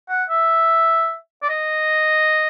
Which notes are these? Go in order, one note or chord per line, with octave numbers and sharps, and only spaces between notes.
F#5
E5
D5
D#5